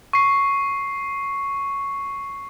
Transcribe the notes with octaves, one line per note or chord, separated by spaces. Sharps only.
C#6 C7